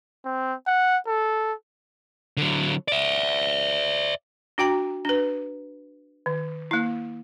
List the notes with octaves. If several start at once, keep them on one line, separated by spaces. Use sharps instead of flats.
C4
F#5
A4
D3 F#3
D5 E5
D4 F#4 G5 A#5
D4 B4
D#3
A#3 E4